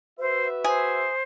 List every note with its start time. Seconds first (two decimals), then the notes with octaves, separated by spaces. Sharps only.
0.20 F#4 B4 C5 E5
0.64 G#4 C5